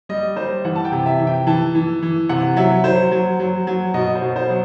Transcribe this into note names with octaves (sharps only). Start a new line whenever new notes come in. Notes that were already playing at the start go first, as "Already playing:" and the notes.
G3 D#5
G3 C5
E3 F#5
A5
G5
C3
E5
E3
G5
E3 A5
E3
E3
C3 F#5
F#3 E5
F#3 C5
F#3
F#3
F#3
B2 D#5
C5
B2
C5
F#3